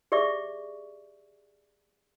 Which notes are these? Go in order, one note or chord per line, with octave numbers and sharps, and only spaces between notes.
G4 G#4 D5 E5 C#6